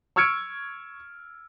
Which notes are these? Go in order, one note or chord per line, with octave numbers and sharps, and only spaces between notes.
C#6 E6 F6 G#6 C#7 D7